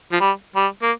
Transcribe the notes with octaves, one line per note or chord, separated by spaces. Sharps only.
F3
G3
G3
A#3